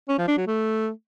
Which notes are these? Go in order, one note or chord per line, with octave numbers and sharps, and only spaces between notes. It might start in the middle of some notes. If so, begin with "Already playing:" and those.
C#4
F3
D4
F#3
A3